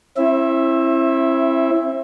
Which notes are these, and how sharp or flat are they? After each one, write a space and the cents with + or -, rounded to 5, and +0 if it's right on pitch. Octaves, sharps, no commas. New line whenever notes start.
C4 +45 E4 +15 E5 +0